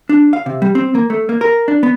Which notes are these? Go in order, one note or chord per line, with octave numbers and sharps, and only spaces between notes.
D4
F5
C3
G3
C4
A#3
A3
A#3
A#4
D4
B3